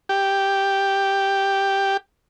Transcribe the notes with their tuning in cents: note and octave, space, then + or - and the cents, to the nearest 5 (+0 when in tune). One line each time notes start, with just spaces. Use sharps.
G4 +0